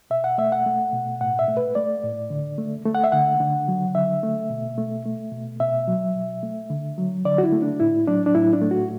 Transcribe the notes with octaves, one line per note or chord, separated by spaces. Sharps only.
B2 E5
F#5
A3 E5
F#5
A3
B2
A2 F#5
E5
A3
B4
A3 D5
A2
D3
A3
A3
F#5
E5
D3 F#5
D3
F#3
D3 E5
A3
B2
A3
A3
B2
B2 E5
F#3
B2
A3
D3
F#3
D3 D5
F#4
E4
A3
D4
A2 E4
F#3 D4
D4
A2 E4
D4
A3
F#4